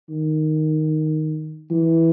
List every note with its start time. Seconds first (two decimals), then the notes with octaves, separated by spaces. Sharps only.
0.10 D#3
1.71 E3